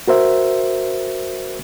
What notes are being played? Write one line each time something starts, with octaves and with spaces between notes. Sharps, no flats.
F#4 A#4 C5 E5